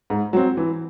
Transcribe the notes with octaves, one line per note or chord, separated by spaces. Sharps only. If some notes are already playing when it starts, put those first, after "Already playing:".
G#2
F#3 C4
E3